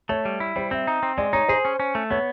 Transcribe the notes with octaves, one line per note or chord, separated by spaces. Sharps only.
A3 C#5
G3
E4
G3 C5
C4 E5
D#4
C4
G#3 D5
D#4 C#5
G#4 C5
C#4
C#4
A3
B3 C#5